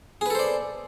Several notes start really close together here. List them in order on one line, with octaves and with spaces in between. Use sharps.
G#4 B4 A4 C5 D5